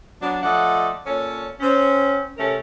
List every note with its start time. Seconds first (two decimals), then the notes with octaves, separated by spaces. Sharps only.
0.21 F#3 B3 D4
0.42 F3 A3 D5 D#5 F#5
1.06 A#2 C#4 A4 C#5
1.60 C4 C#4
2.38 C3 A3 C#4 A4 A#4